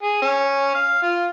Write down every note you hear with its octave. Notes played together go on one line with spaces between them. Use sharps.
G#4
C#4
F5
F4